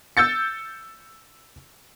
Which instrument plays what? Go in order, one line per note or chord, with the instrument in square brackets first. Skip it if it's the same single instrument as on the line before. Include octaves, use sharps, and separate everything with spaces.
[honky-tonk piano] E6 G6 A6 C#7